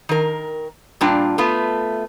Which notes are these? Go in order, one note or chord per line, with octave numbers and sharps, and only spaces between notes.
D#3 A#4
A#2 G3 D4 F4 G5
A3 B3 F4